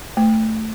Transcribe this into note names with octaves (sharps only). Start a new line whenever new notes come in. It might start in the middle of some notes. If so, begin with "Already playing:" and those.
A3